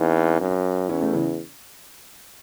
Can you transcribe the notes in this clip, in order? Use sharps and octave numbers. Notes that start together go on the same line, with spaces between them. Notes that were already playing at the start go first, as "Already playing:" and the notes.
Already playing: E2 C4 D#4
F#2
E2 C#4 E4
A3 C#4
C#3 E3